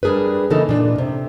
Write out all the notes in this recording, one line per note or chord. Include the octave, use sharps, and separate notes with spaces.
G3 D4 G#4 A#4 B4
C#3 E3 A#3 D#4 A4
A#2 D4
C3